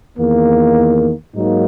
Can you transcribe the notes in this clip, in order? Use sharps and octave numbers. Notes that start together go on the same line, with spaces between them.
E2 D#3 A#3
G#2 F#3 A#3 D#4